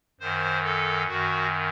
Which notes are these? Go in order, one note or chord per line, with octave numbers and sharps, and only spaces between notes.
F#2 D#3 C5
A4
F#2 D#3 F#4